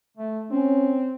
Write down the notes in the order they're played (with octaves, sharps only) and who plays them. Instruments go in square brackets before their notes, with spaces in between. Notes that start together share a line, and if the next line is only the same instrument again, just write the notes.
[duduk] A3
[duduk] C4 [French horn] C#4